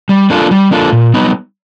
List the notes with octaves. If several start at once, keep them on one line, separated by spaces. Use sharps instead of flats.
G3
A#3 D4 F4 A4
G3
A#3 D4 F4 A4
A#2
G3 B3 D#4